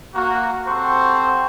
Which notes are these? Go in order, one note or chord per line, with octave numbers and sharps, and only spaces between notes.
A#3 F#4
C4 G4 A4 C5 F#5 C#6